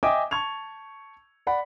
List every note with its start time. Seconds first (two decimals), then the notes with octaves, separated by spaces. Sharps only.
0.03 D#5 E5 G5 G#5 D6 D#6
0.31 A5 C#6 G#6 F7
1.47 D5 F#5 B5